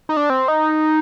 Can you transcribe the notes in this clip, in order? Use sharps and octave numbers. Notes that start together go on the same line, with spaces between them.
D#4
D4
C4
D#4